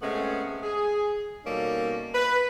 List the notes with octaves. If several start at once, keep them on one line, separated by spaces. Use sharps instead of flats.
C3 G#3 A3 B3 C#4
G#4
B2 G3 A#3 C#4 D#4 A4
B4